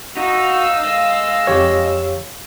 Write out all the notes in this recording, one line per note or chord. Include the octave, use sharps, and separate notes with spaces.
D#4 F#4 F5 E6
G#3 D#5
F2 G4 C#5